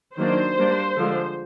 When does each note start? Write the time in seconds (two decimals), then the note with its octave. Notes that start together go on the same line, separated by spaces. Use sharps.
0.17 D#3 F#3 A#3 D4 C5
0.57 G3 A#3 D4
0.97 D3 F3 G#3